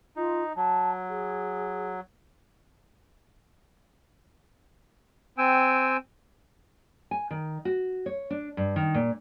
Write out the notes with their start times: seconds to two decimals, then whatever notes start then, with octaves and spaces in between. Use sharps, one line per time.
0.16 D#4 F4
0.56 F#3 A5
1.09 G#4
5.38 C4 G5 G#5 E6
7.11 G#5
7.31 D#3
7.65 F#4
8.06 C#5
8.30 D4
8.57 G2
8.76 D#3
8.94 A#2